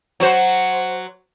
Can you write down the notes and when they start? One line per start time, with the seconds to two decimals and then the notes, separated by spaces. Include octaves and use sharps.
0.20 F#3 F#4 C5